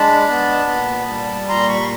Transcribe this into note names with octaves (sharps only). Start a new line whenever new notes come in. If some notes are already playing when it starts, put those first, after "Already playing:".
Already playing: G#3 D4 A5 B5
B3
A#2
G3
A#2 A#5 C6
B5 C#6